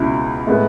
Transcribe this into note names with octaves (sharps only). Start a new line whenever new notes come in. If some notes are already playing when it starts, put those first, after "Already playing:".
Already playing: C#2 B2 E4
A2 G#3 B3